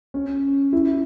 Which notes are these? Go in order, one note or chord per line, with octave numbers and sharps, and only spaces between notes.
C#4
E4